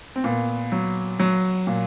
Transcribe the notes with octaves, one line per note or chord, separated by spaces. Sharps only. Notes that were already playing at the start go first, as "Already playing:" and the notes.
C4
A#2 B3
F#3
F#3
A#2